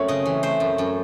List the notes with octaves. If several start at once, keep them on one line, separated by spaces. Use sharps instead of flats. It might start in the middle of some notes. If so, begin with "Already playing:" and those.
Already playing: F#2 A3 C4 A4 C#5
C#3 D#5
E3
A3 C5
F#2
F#2